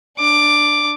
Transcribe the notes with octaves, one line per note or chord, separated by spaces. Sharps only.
D4 D6